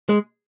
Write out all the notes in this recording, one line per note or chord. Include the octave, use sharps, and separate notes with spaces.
G#3